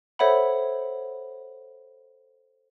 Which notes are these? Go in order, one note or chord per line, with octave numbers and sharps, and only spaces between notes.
A4 C5 C#5 E5 F#5 B5